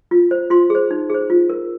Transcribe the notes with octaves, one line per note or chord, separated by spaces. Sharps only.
F4
C5
F4 C6
G#4 C5
D#4
G#4 C5
F4
A#4